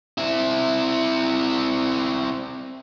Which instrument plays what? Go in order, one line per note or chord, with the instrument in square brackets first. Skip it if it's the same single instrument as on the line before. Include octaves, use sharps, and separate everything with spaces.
[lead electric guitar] C4 E4